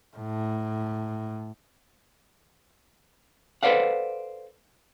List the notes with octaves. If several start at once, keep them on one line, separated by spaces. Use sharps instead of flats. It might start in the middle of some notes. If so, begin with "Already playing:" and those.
A2
A4 B4 C5 D5 F5 F#5